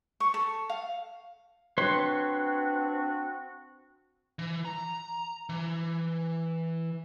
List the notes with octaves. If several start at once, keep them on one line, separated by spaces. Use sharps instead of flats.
C#6
A4
F5
C4 D4 F#4 B4 C#5 C6
E3
A#5
E3